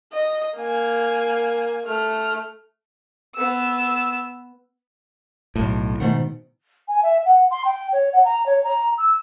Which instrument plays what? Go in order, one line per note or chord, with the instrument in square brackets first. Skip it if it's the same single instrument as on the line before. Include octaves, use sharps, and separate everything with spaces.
[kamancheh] D#5
A#3 G#5
A3 F6
[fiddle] B3 E6
[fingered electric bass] B1 A2
[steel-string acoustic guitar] G#2 A3 F#5 [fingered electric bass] B2 D#3
[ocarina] G#5
E5
F#5
C6
G5
C#5
F#5
A#5
C#5
A#5
E6